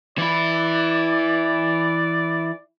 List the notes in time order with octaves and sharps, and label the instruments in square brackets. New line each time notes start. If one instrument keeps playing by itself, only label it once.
[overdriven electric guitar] E3 E4 [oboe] D5